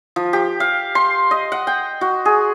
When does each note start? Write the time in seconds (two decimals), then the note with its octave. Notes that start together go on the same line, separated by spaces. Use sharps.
0.16 F3
0.33 G4
0.60 F5
0.95 C6
1.31 D#5
1.52 F#5
1.67 G5
2.01 F#4
2.25 G#4